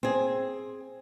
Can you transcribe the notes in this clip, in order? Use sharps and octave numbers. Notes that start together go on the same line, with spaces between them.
C4 G#4